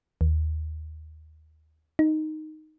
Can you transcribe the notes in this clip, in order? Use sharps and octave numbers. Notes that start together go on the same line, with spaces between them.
D#2
D#4